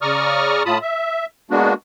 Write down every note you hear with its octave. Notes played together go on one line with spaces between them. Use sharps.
C#3 D5 A#5 C#6 D#6 F6
A2 F4 A5 B5 D#6
E5
G#3 A#3 B3 D4 F#4